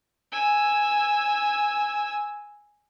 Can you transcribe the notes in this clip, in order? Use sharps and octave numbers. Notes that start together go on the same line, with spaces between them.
G#5 E6